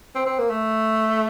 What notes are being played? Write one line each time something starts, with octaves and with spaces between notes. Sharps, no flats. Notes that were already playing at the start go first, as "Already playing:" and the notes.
C4
C4
A#3
A3